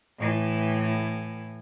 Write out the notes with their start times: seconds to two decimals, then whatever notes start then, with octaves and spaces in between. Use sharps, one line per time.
0.18 A2 E3